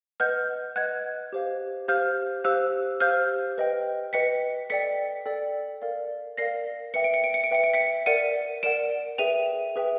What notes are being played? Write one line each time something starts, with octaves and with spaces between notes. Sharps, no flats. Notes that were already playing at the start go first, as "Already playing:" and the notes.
B4 D#5 F#5 F6 G6
B4 D#5 F#5 F#6 G#6
G4 C5 F5
G4 C5 F5 F6 G6
G4 C5 F5 E6 F#6
G4 C5 F5 F6 G6
B4 D#5 G5
B4 D#5 G5 B6 C#7
A4 D5 G5 B6 C#7
A4 D5 G5
A#4 D5 F5
A#4 D5 F5 A#6 C7
B4 E5 G5 C#7
D7
C#7
D7
C#7
D7
B4 E5 G5 C#7
D7
B6 C#7
A#4 D5 F#5 C#7 D#7
A#4 D5 F#5 D7 E7
G#4 B4 E5 G5 D#7 F7
G#4 B4 E5 G5